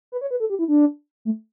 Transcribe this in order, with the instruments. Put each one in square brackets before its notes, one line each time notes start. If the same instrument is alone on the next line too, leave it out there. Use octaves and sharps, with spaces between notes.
[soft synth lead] B4
C#5
B4
A4
G4
E4
D4
A3